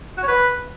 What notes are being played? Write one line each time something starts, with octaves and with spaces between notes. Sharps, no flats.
F#4
C#5
B4